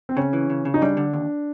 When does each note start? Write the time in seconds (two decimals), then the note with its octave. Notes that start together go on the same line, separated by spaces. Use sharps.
0.09 C4
0.17 C#3 C#4
0.33 E3
0.50 C#3
0.65 C#3
0.74 D#4
0.82 G3 D4
0.97 D3
1.13 D#2